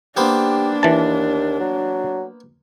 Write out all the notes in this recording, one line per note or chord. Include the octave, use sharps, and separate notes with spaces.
A#3 B3 D4 G4 C5
D#2 E3 A5
F#3